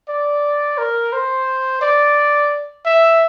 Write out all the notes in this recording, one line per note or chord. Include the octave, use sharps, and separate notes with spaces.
D5
A#4
C5
D5
E5